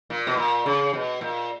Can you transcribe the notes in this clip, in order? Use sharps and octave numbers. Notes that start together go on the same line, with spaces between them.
A#2
B2
A#2
C#3
B2
A#2